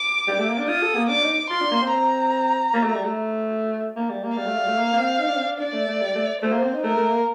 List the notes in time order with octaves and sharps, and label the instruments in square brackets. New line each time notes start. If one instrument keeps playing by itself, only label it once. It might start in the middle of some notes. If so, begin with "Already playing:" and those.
Already playing: [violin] D6
[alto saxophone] G3
A3
A#3
D4
[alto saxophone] F4 [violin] D#6
[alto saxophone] A4
A#3
[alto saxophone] D4 [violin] D6
[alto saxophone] D#4
[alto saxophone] F4 [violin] C6
[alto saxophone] D4
A#3
C4
[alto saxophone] C4 [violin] A#5
[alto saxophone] A#3
A3
G3
A3
A#3
G3
A#3
[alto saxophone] G3 [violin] F5
[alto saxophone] A3
G3
A3
A#3
A#3
C4
D#4
D4
C4
D4
[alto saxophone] D4 [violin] D5
[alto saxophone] A3
A3
G3
A3
[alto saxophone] A3 [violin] C5
[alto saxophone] A#3
C4
D#4
[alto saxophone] A3 [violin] A#4
[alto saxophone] A3
A#3